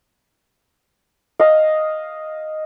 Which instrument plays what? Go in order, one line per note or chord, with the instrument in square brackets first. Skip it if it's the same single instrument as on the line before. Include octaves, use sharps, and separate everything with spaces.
[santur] D#5 F5